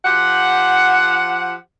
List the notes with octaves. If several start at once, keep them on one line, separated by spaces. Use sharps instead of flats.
F3 G4 F#5